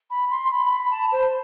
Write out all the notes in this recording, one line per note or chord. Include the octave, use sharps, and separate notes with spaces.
B5
C6
B5
B5
A5
C5